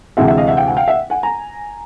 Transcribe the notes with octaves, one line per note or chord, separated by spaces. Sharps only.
D2 C3 E3 G#3 C4 E5 F#5
E5 F#5
D#5 F5
E5 F#5
F5 G5
F#5 G#5
F5 G5
E5 F#5
F#5 G#5
G#5 A#5